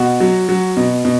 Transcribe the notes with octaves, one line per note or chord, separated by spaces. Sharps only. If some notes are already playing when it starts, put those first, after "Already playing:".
Already playing: B2 F#4
F#3
F#3
B2
B2